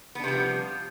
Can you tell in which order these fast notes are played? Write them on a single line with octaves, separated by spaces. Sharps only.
B3 D4 C3 G3 F3